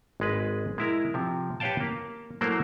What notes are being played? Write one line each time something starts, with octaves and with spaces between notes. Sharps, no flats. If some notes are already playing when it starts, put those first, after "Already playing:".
G#1 G#3 B4
G#3 E4 A#4
C3 F3
G4 B4 C#5 F5 G5 A5
A#3
F#3 A3 A#3 E4 A#4 C5